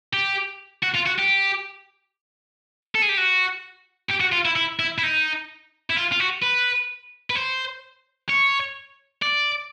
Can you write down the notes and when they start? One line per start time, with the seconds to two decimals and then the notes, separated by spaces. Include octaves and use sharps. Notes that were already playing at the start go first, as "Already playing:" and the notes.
0.13 G4
0.83 F#4
0.95 F4
1.07 F#4
1.19 G4
2.95 A4
3.02 G#4
3.09 G4
3.17 F#4
4.10 G4
4.21 F#4
4.33 F4
4.45 E4
4.56 E4
4.79 E4
4.98 E4
5.03 D#4
5.90 E4
5.97 F4
6.12 F4
6.20 F#4
6.43 B4
7.30 B4
7.35 C5
8.30 C#5
9.22 D5